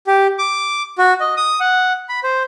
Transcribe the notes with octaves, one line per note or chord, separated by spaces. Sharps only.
G4
D6
F#4
D#5
D#6
F#5
B5
C5